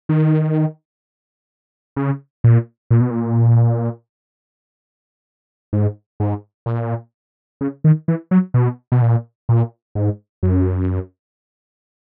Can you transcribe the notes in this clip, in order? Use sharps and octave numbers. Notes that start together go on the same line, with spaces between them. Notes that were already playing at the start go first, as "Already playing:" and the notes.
D#3
C#3
A#2
A#2
B2
A#2
G#2
G#2
A#2
C#3
D#3
E3
F#3
B2
B2
A#2
A#2
G#2
F#2